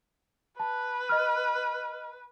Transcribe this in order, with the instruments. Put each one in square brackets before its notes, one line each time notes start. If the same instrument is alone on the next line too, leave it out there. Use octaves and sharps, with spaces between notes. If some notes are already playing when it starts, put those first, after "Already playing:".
[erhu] B4 [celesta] A5
[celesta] D#5 F6